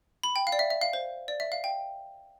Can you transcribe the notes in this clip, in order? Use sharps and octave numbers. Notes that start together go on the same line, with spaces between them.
B5
G5
F5
D5
E5
E5
F5
C5
D5
E5
F5
G5